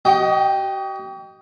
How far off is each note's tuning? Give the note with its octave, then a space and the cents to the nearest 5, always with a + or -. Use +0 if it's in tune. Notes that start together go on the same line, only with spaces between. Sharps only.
F#4 +45 D#5 +0 G5 +0